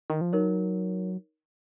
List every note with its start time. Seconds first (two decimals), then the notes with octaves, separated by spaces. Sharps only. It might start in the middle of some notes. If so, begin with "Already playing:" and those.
0.10 D#3
0.21 F3
0.33 F#3 D#4 A#4 C#5